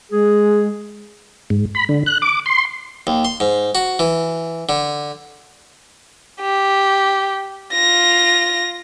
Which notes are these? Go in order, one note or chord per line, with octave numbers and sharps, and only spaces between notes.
G#3 G#4
G#2
B5
D3
F#6
D6
C6
D#2
C6
G#2
F#4
E3
D3
G4
F4 A#6